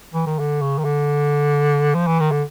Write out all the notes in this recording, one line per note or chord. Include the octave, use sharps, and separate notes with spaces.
E3
D#3
D3
C#3
D#3
D3
F3
E3
D#3
D3